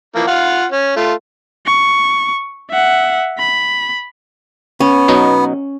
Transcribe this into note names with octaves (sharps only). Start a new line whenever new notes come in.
E3 F3 A#3
F4 F5 F#5
C#4
A3 F4
C#6
E5 F#5
B5
B3 C#4
B2 F#3 D#4